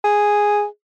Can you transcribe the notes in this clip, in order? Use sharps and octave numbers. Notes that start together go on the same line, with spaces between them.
G#4